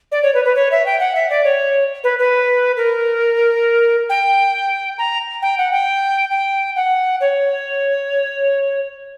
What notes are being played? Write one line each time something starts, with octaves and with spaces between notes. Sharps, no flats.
D5
C#5
B4
B4
C#5
E5
G5
F#5
E5
D5
C#5
B4
B4
A#4
G5
A#5
G5
F#5
G5
G5
F#5
C#5